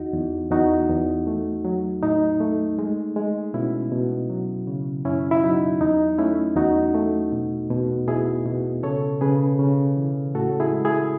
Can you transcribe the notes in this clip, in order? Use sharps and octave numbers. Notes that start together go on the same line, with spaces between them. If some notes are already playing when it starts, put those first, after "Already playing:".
Already playing: E2 D#4 F#4
E2
E2 D#4 F#4
E2
A3
F#3
A2 D#4
A3
G#3
G#3
B2 C#4 E4
B2
F#3
C#3
F#2 C#4 E4
E4
F#3 D#4
E2 D#4
A3 C#4 E4
E2 D#4 F#4
A3
B2
B2
B2 E4 G#4
B2
C#3 A4 C#5
C#3 G#4 B4
C#3
E3
A2 F#4 A4
E4 G#4
G#3
E4 G#4